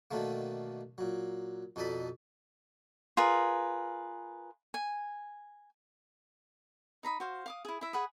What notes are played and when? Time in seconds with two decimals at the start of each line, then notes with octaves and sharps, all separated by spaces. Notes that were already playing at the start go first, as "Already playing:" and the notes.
0.11 B2 D3 D#3 A3 A#3
0.98 A#2 F#3
1.76 F2 B2 D#4 A4 D5 B5
3.17 F4 G#4 A#4 B4
4.74 G#5
7.03 D#4 A#5 B5 D#6
7.20 F#4 C5 F5
7.46 F5 D6 D#6
7.65 E4 G#4
7.81 E4 E5
7.93 G#4 F#5 B5 D#6